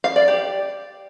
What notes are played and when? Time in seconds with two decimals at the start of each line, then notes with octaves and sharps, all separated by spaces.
0.04 F5
0.16 D5
0.28 G4